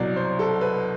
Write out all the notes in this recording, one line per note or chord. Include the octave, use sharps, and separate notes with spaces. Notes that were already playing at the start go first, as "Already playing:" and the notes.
Already playing: C2 B2 F#3 D5
C5
A4
B4